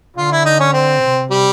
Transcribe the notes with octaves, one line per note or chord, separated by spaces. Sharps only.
D3 F4
E4
D#4
C#4
C4
C3
G3